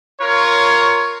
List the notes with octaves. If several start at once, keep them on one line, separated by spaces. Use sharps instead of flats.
F4 A#4 C#5